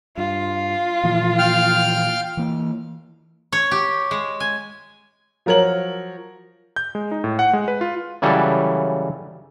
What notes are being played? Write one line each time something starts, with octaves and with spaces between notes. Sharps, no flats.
G2 F4
A#2 E3 F3
F5 G5 F6
E3 A#3
C#5
G4
G#3
G#5
F3 F#3 A#4 C#5 F#7
G6
G#3
D#4
A2
F#5
G#3
B4
F4
C#3 E3 F#3 G3 A4